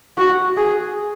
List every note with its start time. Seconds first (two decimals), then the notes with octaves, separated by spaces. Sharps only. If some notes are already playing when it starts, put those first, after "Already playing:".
0.18 F#4
0.57 G#4